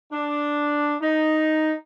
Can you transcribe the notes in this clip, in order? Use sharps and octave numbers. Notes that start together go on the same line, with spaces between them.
D4
D#4